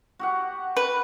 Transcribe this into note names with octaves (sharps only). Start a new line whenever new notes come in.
F#4 G4 F#5
B4